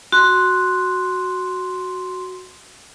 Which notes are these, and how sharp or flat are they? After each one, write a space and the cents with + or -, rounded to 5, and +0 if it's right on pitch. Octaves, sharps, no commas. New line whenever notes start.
F#4 +0 C6 +0